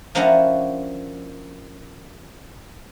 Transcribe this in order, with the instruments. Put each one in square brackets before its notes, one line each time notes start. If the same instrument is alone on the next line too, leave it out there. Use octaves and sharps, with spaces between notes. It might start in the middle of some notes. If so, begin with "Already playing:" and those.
[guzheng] F3 A#3 C#4 D4 E4 F#4